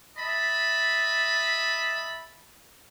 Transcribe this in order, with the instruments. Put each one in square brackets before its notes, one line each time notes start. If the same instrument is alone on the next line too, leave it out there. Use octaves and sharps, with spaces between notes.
[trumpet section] D#5 E5 A5 B5